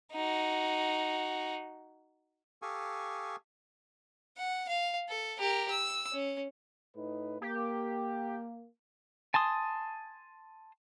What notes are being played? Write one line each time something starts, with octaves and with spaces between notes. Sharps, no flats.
D#4 F#4
G4 A4 F5 G#5 C#6 D#6
F#5
F5
A4
G4 A#4
E6
C#4
A2 D#4 B4
A#3 G4
G#5 A5 C6 D#6